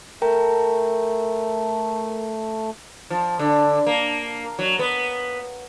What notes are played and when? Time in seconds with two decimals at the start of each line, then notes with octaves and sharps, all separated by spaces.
0.22 A3 A#4 G5 A#5
3.10 F3
3.39 D3
3.87 A#3
4.59 F#3
4.79 B3